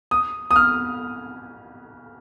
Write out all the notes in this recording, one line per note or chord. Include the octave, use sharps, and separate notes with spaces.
D#6
D#6
F6